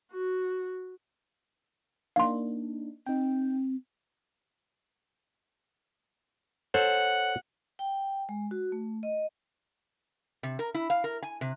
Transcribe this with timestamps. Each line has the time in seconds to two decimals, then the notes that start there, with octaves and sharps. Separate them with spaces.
0.12 F#4
2.16 A#3 D4 D#4 F5 C6
3.06 C4 D#4 G5
6.74 A4 C5 C#5 F#5
7.79 G5
8.29 G#3
8.51 F#4
8.72 A3
9.03 D#5
10.43 C3
10.59 A#4
10.74 E4
10.90 F5
11.04 A#4
11.23 G#5
11.41 C3